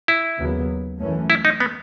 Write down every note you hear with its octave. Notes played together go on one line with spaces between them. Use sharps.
E4
D#2 C#3 F#3 B3
F#2 E3 A3 C#4
E4
D#4
B3